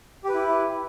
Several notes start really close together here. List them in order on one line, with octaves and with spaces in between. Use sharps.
G4 B4 E4